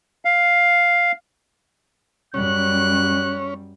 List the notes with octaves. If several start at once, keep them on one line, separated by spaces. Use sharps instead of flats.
F5
F#2 G3 C#4 F#6